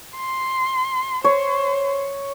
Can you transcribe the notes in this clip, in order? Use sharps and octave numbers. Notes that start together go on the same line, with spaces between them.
C6
C5 C#5